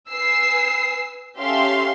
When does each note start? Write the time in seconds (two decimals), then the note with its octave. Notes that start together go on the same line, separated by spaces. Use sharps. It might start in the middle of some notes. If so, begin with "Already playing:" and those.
0.11 B4 G#5 E6 C7
1.39 C#4 G4 A4 E5 F5 C6